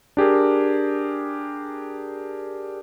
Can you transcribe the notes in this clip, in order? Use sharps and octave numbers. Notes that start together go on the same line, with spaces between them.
D4 G4 G#4 A#4